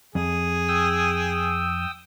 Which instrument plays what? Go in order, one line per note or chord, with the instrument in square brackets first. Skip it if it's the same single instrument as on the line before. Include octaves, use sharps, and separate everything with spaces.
[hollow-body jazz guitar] F2 [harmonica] G#4
[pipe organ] G5 D#6 E6